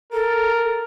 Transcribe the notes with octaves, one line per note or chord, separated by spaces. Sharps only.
A4 A#4